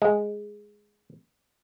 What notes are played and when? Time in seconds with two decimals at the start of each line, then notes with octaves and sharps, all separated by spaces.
0.02 G#3